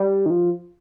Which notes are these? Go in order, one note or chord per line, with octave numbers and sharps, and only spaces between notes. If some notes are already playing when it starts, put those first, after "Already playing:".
Already playing: G3
D#3
F3